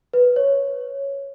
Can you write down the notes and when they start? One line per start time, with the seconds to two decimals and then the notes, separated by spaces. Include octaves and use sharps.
0.14 B4
0.36 C#5